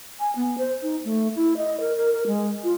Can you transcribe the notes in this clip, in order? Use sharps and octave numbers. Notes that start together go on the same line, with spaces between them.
G#5
B3
C5
D#4
A3
E4
D#5
A#4
A#4
A#4
G#3
F4